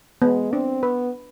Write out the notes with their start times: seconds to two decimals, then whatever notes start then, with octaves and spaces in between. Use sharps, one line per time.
0.22 G#3 B3
0.52 C4 D4
0.82 B3 B4